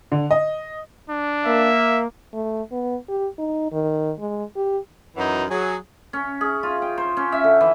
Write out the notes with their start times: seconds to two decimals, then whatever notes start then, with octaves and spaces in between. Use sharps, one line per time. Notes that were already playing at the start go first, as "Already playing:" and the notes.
0.12 D3
0.31 D#5
1.09 D4
1.46 A#3 A#4 E5
2.33 A3
2.72 B3
3.08 G4
3.38 D#4
3.72 D#3
4.19 G#3
4.56 G4
5.17 F#2 E3 F#3 D#4
5.50 F#3 G#4
6.13 C#4
6.41 G#4
6.63 F4
6.82 G5
6.98 C5
7.17 C#4
7.32 E5
7.44 D3
7.61 E3